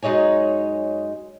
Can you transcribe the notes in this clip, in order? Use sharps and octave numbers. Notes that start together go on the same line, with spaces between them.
F#2 G#3 D#4 C#5 G#5